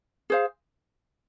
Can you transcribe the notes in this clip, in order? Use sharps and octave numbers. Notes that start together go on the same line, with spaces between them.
G#4 C5 F5